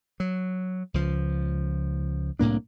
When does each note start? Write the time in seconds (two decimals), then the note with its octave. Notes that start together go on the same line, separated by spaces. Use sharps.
0.20 F#3
0.94 C#2 F3
2.39 C2 A2 A#3 D4